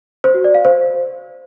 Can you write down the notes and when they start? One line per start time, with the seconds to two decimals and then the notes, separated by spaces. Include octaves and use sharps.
0.24 C5
0.34 F#4
0.44 D5
0.54 F5
0.65 C5